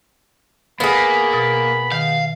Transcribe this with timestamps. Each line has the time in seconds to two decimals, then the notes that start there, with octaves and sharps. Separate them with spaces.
0.80 A#3 B3 G#4 B5
1.33 B2 A6
1.92 D#3 F5